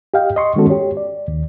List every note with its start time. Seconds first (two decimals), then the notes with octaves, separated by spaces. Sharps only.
0.14 G4 D#5 F5 G5
0.36 D#5 C6 C#6
0.56 D#3 G#3 B3 C#4 F#4 A4
0.70 G4 C#5
0.97 D5
1.28 D#2